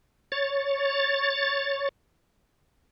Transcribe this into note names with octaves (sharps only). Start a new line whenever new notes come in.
C#5 A6